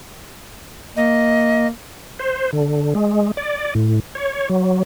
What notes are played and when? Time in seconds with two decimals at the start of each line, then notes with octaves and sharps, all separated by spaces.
0.96 A#3 D#5
2.19 C5
2.53 D3
2.95 G#3
3.37 D5
3.75 A2
4.15 C#5
4.50 F#3